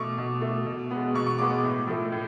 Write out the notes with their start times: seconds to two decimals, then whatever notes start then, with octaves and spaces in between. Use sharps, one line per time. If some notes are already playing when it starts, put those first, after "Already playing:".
Already playing: B2 A3 C#6 D6
0.18 B2
0.42 A3
0.66 B2
0.91 G#3 B3
1.14 B2 C#6
1.26 C#6
1.39 G#3 B3 D6
1.64 A2
1.87 F3 A3
2.12 A2